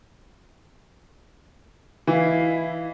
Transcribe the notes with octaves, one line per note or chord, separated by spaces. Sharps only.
E3 E4 D#5 F5